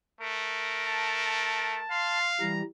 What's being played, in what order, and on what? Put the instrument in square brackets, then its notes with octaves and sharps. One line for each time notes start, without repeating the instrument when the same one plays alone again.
[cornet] A3 [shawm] A#4
[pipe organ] A5
[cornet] F5 [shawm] C6
[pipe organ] E3 G3 [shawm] A#5